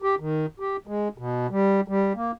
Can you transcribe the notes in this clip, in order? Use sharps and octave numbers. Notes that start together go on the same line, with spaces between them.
G4
D#3
G4
G#3
B2
G3
G3
A#3